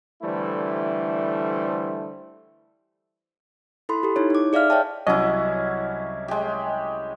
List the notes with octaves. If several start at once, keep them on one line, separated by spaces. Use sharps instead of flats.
D3 E3 G3 A3 E4 C5
E4 A4 B5 C6
G4 A4
D#4 E4 C#5
D#4 D6
G#4 D5 E5 F5 F6
C#5 D#5 E5 G5 A5
C2 F#3 C#4 E4 D#5 F#5
G#3 G4